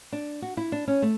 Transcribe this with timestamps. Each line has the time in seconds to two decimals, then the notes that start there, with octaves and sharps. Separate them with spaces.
0.12 D4
0.42 F#4
0.57 E4
0.72 D4
0.88 C#4
1.02 A3